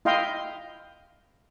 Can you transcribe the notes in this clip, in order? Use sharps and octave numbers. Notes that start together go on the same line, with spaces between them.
E4 D#5 F5 G5 C6